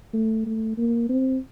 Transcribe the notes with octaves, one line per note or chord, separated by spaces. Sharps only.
A3
A3
A#3
C4